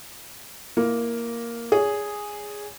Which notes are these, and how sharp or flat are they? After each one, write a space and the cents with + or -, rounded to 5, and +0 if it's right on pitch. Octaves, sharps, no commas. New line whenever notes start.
A#3 +0 E4 +20
G#4 -5 C#5 +35